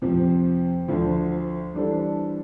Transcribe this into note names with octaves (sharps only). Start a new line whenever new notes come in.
F2 C3 F3
D2 D3 F3
E3 G3 D4 A4 C5